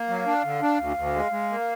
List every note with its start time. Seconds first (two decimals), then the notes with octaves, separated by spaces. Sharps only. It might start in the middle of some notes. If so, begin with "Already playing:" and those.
Already playing: A#3
0.09 F#3 F5
0.26 D4
0.44 D3
0.62 D4
0.79 D2
0.97 D2
1.15 G#3
1.32 G#3
1.50 A#3